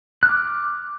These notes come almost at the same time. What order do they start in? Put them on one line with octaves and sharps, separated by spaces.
F#6 F6 D6